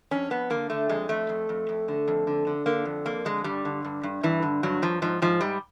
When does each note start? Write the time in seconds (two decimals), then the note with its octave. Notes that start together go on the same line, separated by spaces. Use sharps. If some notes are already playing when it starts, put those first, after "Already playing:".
0.11 F2 C#4
0.30 F2 B3
0.50 D3 A#3
0.70 D3 A3
0.89 F2 G#3
1.09 F2 A3
1.29 F2
1.49 F2
1.69 F2
1.88 D3
2.08 F2
2.27 D3
2.47 D3
2.66 D3 A#3
2.85 F2
3.06 F2 A#3
3.25 D3 G#3
3.44 G2 G3
3.65 D3
3.84 G2
4.03 G2
4.23 G2 E3
4.42 D3
4.63 G2 F#3
4.82 G2 F3
5.02 G#2 F3
5.22 G#2 F3
5.41 G#2 G3